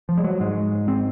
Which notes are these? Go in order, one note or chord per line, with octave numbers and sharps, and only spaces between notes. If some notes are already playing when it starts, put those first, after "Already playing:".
F3
G#3
F#3
G#2 G#3
C4